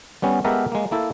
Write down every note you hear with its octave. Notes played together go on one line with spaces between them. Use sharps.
G3 B3 C#4
G#3 B3 G4 A4 A#4 E5
G#3 A#3
A#3 E4 A4